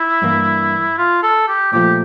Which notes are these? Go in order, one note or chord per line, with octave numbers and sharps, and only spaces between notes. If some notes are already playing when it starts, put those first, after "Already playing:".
Already playing: E4
G2 E3 A#3
F4
A4
G4
A#2 F3 A3 G4